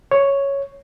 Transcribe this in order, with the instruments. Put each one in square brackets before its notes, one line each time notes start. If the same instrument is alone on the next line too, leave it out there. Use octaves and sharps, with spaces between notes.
[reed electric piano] C#5